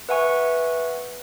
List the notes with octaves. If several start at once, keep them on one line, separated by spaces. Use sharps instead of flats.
B4 E5 F#5 G#5 C#6